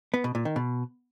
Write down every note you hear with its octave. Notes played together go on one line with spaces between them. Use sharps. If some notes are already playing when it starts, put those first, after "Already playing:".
B3
B2
A#2
D#3
B2